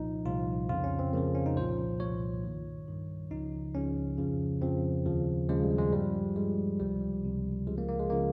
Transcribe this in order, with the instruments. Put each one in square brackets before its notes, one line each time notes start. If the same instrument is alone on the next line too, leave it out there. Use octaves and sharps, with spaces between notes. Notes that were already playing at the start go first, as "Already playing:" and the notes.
Already playing: [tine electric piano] C2 A#2 F3 D#4
C2 A#2 F3 F4
F2 C#3 F3 F4
C#4
C4
F2 C#3 F3 A#3
C#4
D#4
C2 A#2 F3 C5
C2 A#2 F3 C#5
G2 D#3
G2 D#3
C#2 C#3 F3 D#4
C#2 C#3 F3 C#4
F2 C#3 F3
F2 C#3 F3 C4
D#2 C#3 F3
D#2 C#3 F3 G#3
G3
G#3
G2 F3 G3
G2 F3 G#3
C#2 C3 F3 G3
C#2 C3 F3
C#2 C#3 F3 G#3
A#3
A#3
G#3
C#3 F3 A#3